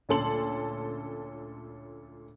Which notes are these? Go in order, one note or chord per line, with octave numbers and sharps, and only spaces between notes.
D2 A#2 C#4 A4 C6 F#7